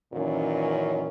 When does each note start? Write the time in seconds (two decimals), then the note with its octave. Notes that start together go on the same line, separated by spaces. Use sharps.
0.13 F#2 A#2 D#3 E3 C#4